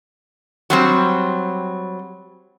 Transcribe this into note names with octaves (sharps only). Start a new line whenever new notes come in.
F#3 G3 C4